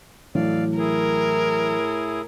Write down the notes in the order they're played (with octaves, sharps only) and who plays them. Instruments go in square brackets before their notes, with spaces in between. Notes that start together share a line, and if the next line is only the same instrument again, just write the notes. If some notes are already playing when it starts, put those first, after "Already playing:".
[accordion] F2 D5 F5 [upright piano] A2 [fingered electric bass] E3 F#3
[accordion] E4 G#4 [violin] A#4